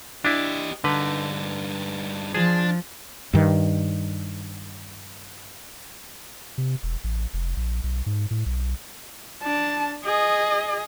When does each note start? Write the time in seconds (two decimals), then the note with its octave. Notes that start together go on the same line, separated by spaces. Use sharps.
0.25 D4 E4 G4 D#5
0.84 G2 D3 D#4 B4
2.34 F3 D4 G#4
3.33 G2 D#3
6.58 C3
6.83 E1
7.04 A1
7.33 F1
7.57 A#1
7.84 B1
8.06 G#2
8.31 A2
8.46 B1
9.43 D4 A5
10.05 G#4 D#5